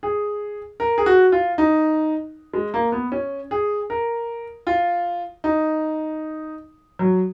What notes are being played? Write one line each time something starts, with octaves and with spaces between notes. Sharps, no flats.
G#4
A#4
G#4
F#4
F4
D#4
G#3
A#3
B3
C#4
G#4
A#4
F4
D#4
F#3